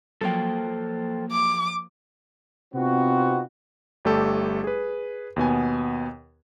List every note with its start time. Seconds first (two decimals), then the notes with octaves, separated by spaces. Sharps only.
0.21 F3 F#3 A#3 A4 C5 G5
1.32 D6
2.74 C3 B3 C4 D#4 F4 F#4
4.05 G1 G3 A3 G4 A4
4.64 G#4 B4
5.36 D#2 B2 B3 G#5